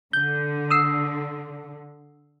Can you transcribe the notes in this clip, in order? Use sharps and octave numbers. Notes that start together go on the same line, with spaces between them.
D3 G6
D#6 E6 C7